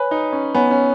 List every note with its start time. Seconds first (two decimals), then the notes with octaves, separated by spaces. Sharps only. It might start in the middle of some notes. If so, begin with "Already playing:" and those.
Already playing: B4 C#5 G#5 B5
0.11 D#4
0.33 C#4
0.54 B3 C#5 G#5 B5
0.71 C#4